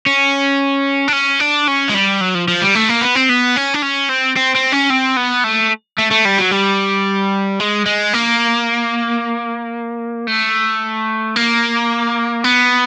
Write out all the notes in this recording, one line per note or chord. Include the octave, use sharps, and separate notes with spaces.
C#4
D4
C#4
D4
C#4
G#3
G3
F#3
F3
F3
G3
A3
A#3
B3
C4
B3
C#4
D4
C#4
C4
C4
C4
C#4
C4
B3
A3
A3
A3
G3
F#3
G3
G#3
G#3
A#3
A3
A#3
B3